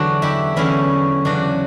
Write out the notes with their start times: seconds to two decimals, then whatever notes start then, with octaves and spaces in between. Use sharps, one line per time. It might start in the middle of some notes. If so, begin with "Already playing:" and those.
Already playing: E2 D3 F#3 D4 F#4
0.22 E4 G4
0.56 E2 D3 F#3 C#4 E4
1.25 E2 C#3 F#3 D4 F#4